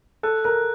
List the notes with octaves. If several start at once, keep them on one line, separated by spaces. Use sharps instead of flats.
A4 F#6
A#4 F#6